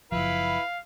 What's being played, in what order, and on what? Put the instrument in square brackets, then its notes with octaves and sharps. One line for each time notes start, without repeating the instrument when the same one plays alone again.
[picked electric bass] F#1 B1 F3 [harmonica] E4 B4 [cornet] F5